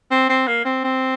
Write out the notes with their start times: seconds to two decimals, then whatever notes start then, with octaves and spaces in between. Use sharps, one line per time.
0.11 C4
0.29 C4
0.47 A#3
0.65 C4
0.84 C4